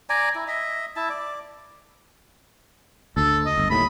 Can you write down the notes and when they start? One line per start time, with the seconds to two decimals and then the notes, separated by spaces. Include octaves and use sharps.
0.10 D5 G#5 A#5
0.35 E4
0.48 D#5 E5
0.96 E4 A5
1.09 D5
3.17 D2 A4
3.46 D#5
3.58 G1
3.70 D#2 A2 B5